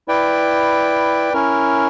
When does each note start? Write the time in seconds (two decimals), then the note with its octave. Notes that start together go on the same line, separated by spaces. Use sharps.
0.08 E4 B4 D5 G5
1.33 C#4 E4 A#4